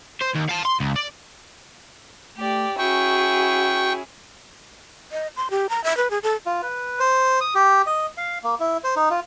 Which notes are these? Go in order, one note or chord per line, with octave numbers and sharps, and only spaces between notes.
C5
D#2
F5 A5
C6
C#2
D5
A3 G4 D5
C#4 E4 F#4 G#4 G5 C#6
D#5
C6
G4
A#5
E5
B4
G#4
A4
F4
B4
C5
D#6
G4
D#5
F5
A#3
E4
C5
D#4
F4